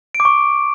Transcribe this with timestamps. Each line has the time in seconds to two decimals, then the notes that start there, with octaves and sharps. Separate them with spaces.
0.15 D7
0.20 D6
0.25 C#6